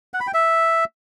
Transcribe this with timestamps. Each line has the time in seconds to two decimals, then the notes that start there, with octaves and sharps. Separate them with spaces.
0.14 F#5
0.20 B5
0.27 G5
0.34 E5